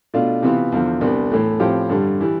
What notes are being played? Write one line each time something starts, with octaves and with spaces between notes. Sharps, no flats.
B2 A3 D4 F4
C3 E3 B3 F4
E2 D3 F3
C2 C3 G3 B3 D4
A2 E3 A3
A2 F3 C4 G4
G2 D3 G3
E3 G3